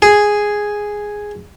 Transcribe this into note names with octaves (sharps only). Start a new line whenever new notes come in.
G#4